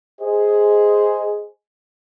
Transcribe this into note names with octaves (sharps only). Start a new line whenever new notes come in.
G#4 C5 D#5